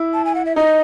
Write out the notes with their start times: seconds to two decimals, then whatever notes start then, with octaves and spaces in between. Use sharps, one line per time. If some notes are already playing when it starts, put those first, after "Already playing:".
Already playing: E4
0.14 A5
0.25 G#5
0.35 F#5
0.45 E5
0.56 D#4 D#5